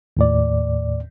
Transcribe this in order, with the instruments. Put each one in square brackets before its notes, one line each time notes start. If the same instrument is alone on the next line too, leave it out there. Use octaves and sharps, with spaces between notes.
[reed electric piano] D#2 A2 D5